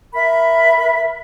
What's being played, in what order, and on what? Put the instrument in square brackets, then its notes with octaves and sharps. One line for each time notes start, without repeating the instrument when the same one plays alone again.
[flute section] A#4 E5 B5